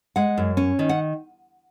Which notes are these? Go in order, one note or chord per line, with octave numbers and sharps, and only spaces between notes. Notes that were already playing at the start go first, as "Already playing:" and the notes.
G#3 F#5
F#2
C#4
D#3
F#5